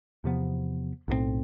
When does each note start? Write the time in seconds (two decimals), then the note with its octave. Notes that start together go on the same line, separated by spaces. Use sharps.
0.24 E2 C3 F3 B3
1.08 B1 A2 F3 C4